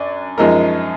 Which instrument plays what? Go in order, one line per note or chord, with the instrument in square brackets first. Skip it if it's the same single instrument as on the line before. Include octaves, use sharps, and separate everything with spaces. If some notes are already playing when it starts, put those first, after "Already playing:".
Already playing: [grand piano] F#2 D4
F#2 F3 G#3 D#4 A#4